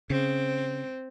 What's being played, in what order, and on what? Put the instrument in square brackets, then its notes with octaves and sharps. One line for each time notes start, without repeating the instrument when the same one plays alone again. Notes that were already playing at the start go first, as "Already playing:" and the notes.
[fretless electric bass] C#3 [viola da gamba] C4